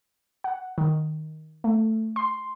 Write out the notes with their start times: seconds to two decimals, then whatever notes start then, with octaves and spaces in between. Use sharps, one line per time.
0.44 F#5
0.78 D#3
1.64 A3
2.16 C6